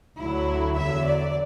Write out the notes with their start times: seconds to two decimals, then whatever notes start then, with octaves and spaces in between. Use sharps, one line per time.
0.18 D2 D3 F#3 E4
0.77 E2 D3 F#3 E5
1.06 D5